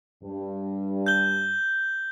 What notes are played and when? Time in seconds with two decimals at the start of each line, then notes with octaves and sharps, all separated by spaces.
0.24 G2
1.06 G6 G7